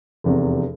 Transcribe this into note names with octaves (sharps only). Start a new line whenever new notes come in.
F1 E2 C3